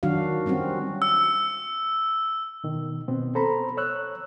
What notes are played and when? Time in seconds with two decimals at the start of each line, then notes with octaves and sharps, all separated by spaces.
0.03 D#3 F#3 D4 F#4 F5
0.46 G3 C4 C#4 F#4
1.02 E6
2.64 B2 D#3
3.08 B2 B3 C4
3.35 A4 C5 A#5 B5
3.77 C#5 E6 F#6